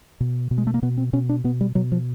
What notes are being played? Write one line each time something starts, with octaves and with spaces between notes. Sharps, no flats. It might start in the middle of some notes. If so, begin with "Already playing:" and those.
B2
B2
G#3
A3
A#3
B2 B3
C4
B2 C#4
D4
B2 B3
G3
B2 F#3
F3